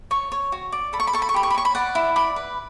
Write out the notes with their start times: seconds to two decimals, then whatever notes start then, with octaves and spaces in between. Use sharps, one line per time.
0.11 C#5 C#6
0.32 C#5
0.52 F#4
0.72 D5
0.93 A4 B5
1.00 C#6
1.07 B5
1.13 A4 C#6
1.22 B5
1.29 C#6
1.34 G4 B5
1.43 C#6
1.50 B5
1.55 C#5 C#6
1.65 B5
1.75 D5 F#5
1.95 E4
2.16 D5 B5
2.36 B4